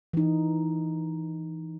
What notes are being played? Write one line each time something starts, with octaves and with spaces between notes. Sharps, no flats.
E3 D#4